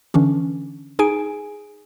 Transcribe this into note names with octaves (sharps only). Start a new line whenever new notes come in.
D3 E3 C#4 D4
D#4 G#4 G#5 D7